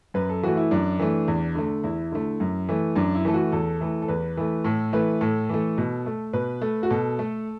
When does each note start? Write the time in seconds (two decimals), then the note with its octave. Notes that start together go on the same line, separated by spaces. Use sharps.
0.14 F#2 B4
0.29 A4
0.43 E3 A3 F#4
0.57 E4
0.71 F#2 D4
0.99 E3 A3
1.28 E2
1.55 D3 A3
1.83 E2 E4
2.12 D3 A3
2.40 F#2
2.69 E3 A3
2.96 F#2 D4
3.15 E4
3.25 E3 A3 A4
3.34 F#4
3.52 E2 A4
3.81 E3 A3
4.02 A4
4.08 E2 B4
4.37 E3 A3
4.64 A2 A4
4.93 E3 A3 B4
5.21 A2 A4
5.49 E3 A3
5.78 B2
6.06 A3
6.33 B2 B4
6.61 A3
6.83 F#4
6.90 B2 A4
7.19 A3